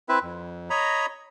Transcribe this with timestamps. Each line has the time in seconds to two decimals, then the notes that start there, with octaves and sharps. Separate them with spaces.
0.09 C4 E4 B4 E5
0.22 F2
0.70 C#5 D#5 A#5 B5